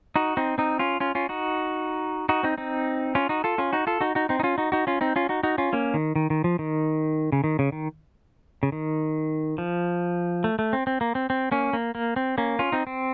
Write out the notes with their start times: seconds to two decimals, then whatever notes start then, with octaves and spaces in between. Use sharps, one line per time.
0.16 D#4 F#4
0.37 C4 D#4
0.58 C4 D#4
0.79 C#4 F4
1.00 C#4 F4
1.15 C#4 F4
1.29 D#4 F#4
2.29 D#4 F#4
2.43 C4 D#4
2.58 C4 D#4
3.15 C#4 F4
3.29 D#4 F#4
3.44 F4 A4
3.58 C#4 F4
3.73 D#4 F#4
3.87 F4 A4
4.01 D#4 F#4
4.15 D#4 F#4
4.29 C4 D#4
4.40 D#4
4.43 C#4 F4
4.58 D#4 F#4
4.72 D#4 F#4
4.87 C#4 F4
5.01 C4 D#4
5.16 C#4 F4
5.29 D#4 F#4
5.43 D#4 F#4
5.58 C#4 F4
5.73 A#3 C#4
5.94 D#3
6.16 D#3
6.30 D#3
6.44 F3
6.59 D#3
7.32 C#3
7.44 D#3
7.59 C#3
7.72 D#3
8.63 C#3
8.72 D#3
9.58 F3
10.44 A3
10.59 A3
10.73 C4
10.87 C4
11.01 A#3
11.15 C4
11.30 C4
11.51 A#3 C#4
11.73 A#3
11.95 A#3
12.16 C4
12.38 A#3 C#4
12.59 C#4 F4
12.72 C4 D#4
12.87 C4